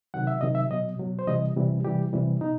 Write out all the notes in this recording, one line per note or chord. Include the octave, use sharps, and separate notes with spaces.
C3 D#3 F#3 F#5
E5
C3 D#3 F#3 D#5
E5
B2 F#3 D#5
B2 F#3
C5
C3 E3 G3 D#5
C3 E3 G3
C3 E3 G3 G4
C3 E3 G3
B2 D#4